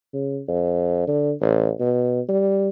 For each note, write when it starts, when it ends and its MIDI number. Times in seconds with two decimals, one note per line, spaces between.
0.13 0.41 49
0.48 1.03 41
1.07 1.32 50
1.41 1.71 33
1.80 2.21 47
2.29 2.69 55